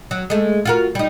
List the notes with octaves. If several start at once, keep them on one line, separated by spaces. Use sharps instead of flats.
F#3
G#3 A3
F4 F#4 A#4
G3 D#4